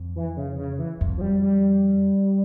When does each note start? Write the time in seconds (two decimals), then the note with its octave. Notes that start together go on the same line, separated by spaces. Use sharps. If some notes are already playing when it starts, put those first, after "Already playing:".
Already playing: F2
0.16 E3
0.37 C#3
0.58 C#3
0.79 E3
1.01 F2
1.18 F3
1.21 G3
1.42 G3